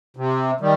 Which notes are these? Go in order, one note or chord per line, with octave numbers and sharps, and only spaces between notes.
C3
D#3 G3